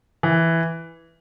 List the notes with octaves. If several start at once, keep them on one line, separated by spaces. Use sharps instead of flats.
E3